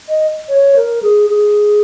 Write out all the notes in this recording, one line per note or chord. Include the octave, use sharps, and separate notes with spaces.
D#5
C#5
A#4
G#4
G#4